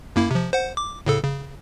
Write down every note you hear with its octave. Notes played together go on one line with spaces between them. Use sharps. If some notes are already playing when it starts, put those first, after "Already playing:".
F#2 A#3 E4
C3 F3
C5 F#5
D6
A2 C#3 A4
C#3